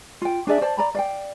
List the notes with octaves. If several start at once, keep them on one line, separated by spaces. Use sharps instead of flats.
F4 G5
D4 G#4 D5 E5
C5 D5 A5
D5 A#5 B5
D5 F5 G5